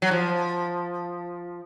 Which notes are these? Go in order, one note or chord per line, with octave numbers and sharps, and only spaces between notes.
F#3
F3